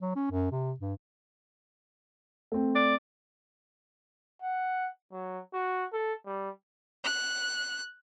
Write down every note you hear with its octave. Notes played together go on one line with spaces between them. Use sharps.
F#3
C#4
F#2
C3
G2
A3 C4
D5
F#5
F#3
F#4
A4
G3
F#6